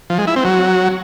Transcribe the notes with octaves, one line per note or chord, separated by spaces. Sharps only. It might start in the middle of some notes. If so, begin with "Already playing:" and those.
F3
G#3
E4
C4
F#3